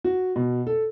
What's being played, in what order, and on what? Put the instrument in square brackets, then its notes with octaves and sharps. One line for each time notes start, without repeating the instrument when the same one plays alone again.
[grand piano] F#4
B2
A4